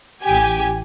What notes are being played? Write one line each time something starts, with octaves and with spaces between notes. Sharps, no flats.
A1 G4 G#5